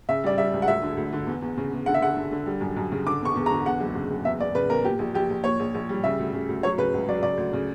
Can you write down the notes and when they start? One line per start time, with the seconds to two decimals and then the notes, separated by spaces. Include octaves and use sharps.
0.09 C#3 E5
0.24 G3 D5
0.37 G3 E5
0.53 C#2
0.62 F#5
0.67 D2 E5
0.82 D3
0.97 D2
1.13 D3
1.27 E2
1.42 E2
1.57 C#3
1.72 E2
1.86 D3 F#5
1.94 E5
2.01 D3 F#5
2.16 D3
2.31 D3
2.46 G3
2.61 F#2
2.77 F#2
2.92 C#3
3.07 D3 D6
3.21 E2 C#6
3.36 E2
3.46 A#5
3.50 D3
3.66 E2 F#5
3.80 F#1
3.95 C#3
4.10 F#1
4.25 E2 E5
4.40 E2 D5
4.55 C#3 B4
4.70 E2 A#4
4.84 A#2 G4
4.99 A#1
5.14 A#1 G4
5.30 A#1
5.44 A#2 C#5
5.60 A#1
5.74 A#1
5.89 G3
6.04 C#3 E5
6.19 D2
6.33 C#3
6.49 D2
6.63 F#3 C#5
6.78 C#3 B4
6.94 C#2
7.08 F#3 D5
7.22 C#3 D5
7.37 D2
7.53 C#3